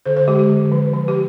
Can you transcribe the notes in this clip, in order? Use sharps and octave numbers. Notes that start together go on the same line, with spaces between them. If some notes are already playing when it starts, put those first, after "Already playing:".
D3 C5
C5
G#3 G4
G4
D3
F3
F3
G4